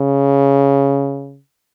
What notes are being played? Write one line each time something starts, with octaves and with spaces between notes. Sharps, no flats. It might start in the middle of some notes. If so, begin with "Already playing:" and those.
Already playing: C#3